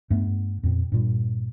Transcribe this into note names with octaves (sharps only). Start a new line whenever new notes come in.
G2 A3 B3
F2 A#2 C4
G2 A#2 G3